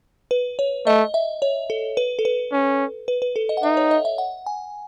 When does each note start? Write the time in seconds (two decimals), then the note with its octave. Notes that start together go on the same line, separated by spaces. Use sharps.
0.31 B4
0.59 C#5
0.86 A3 D#5
1.14 E5
1.42 C#5
1.70 A4
1.97 B4
2.19 A4
2.25 B4
2.52 C#4
3.08 B4
3.22 B4
3.36 A4
3.49 D#5
3.57 F#5
3.63 D#4 E5
3.77 C#5
3.91 D#5
4.05 E5
4.18 F#5
4.46 G#5